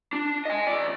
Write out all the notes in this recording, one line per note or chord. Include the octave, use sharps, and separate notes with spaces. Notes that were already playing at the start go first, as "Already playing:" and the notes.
D4
D#5 G#5
D#2 D5